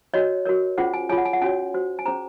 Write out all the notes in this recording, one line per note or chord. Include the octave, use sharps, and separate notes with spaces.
F#4 C#5 D#5
F#4 A#4 C#5
C#4 F4 G#4 C5 F#5
G#5
F4 G#4 C#5 G#5
F#5
G#5
F#5
C#4 F#4 C#5 G#5
F#4 C5
G#5
C#4 G#4 C5 A#5